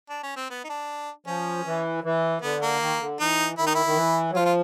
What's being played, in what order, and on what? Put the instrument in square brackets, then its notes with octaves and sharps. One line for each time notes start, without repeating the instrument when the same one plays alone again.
[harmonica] D4
C#4
C4
B3
D#4
D4
[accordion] F3 [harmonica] C#4
[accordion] E3
E3
[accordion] D3 [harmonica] B3
[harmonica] A#3
[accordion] D#3
D3
[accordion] E3 [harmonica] D#4
[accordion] D#3 [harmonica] E4
[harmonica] D#4
E4
[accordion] D#3
E3
F#3
[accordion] F3 [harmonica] F4
[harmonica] F4